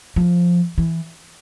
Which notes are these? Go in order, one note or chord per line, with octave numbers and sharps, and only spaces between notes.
F3
E3